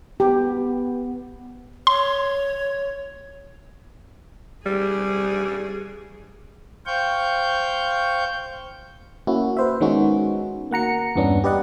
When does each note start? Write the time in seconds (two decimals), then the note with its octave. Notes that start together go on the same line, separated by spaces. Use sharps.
0.20 B3 G4
1.87 C#5 C6
4.66 G3 G#4
6.86 C5 F5 G5 C#6 G6
9.27 A#3 C#4 E4 F#4
9.57 B4 C5 E5
9.81 D#3 G#3 B3 C#4 D#4 F#4
10.71 A#3 F#5 A#5 C#7
11.16 E2 G2 E3 B3 C#4 D4
11.44 G4 B4 D5 D#5 F#5